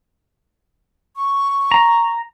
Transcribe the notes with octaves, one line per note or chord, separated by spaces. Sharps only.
C#6
A#5